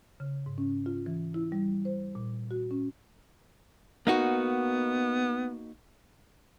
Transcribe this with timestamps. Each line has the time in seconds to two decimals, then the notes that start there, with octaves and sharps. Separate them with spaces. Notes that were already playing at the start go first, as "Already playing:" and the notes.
0.20 C#3
0.46 G#2
0.58 C#4
0.86 F4
1.06 E3
1.34 E4
1.52 G3
1.85 C5
2.15 A#2
2.51 F#4
2.71 C#4
4.07 A#3 B3 D#4 F#4